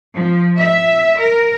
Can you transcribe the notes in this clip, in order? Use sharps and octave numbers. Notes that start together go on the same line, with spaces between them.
F3
E5
A#4